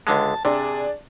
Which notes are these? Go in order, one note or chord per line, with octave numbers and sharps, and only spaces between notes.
C#2 D3 G#3 A5
C3 D4 G#4